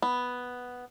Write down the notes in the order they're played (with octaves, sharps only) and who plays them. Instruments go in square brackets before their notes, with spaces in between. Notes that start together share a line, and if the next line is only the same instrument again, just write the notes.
[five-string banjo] B3